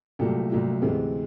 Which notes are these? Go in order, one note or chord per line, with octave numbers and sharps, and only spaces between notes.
C2 A#2 F#3 A3 G4 A4
C2 A#2 F#3 A3
D2 C3 E3 G#3